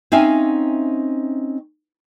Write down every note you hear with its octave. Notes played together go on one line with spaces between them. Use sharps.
C4 C#4 D#4 E5 F5 G#5